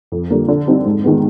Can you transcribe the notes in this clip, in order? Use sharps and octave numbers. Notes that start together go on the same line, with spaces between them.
F2
D3 G3 A#3
D3
G3 C4 D#4
G#2
D#3 G#3 B3